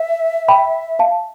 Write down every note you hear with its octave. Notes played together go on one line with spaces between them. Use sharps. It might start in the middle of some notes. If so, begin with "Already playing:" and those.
Already playing: E5
G5 B5
F5 A5